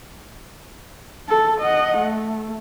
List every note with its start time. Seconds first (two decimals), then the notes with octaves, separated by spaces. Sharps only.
1.29 A4
1.61 D#5 F#5
1.97 A3